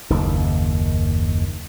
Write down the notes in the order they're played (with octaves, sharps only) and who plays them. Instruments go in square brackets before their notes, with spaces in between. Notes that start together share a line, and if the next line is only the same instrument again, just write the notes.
[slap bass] F#1 D#2 D#3